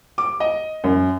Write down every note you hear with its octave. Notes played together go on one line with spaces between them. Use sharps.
D6
D#5
F#2